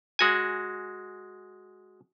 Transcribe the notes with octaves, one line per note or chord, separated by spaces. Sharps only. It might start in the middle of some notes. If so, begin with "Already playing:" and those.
G#3 F#4 G#5